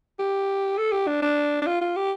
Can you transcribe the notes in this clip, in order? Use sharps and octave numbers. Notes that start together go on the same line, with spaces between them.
G4
A4
G4
D4
D4
D4
F4
F4
G4